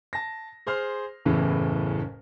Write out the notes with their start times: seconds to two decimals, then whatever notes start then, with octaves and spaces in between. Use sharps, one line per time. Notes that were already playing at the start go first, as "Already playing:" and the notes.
0.13 A5 A#6
0.67 G#4 C5 C6 F6
1.25 F#1 E2 A2 C#3 E3